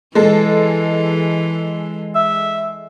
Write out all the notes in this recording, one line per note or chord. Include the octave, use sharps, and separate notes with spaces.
E3 G#3 A4
E5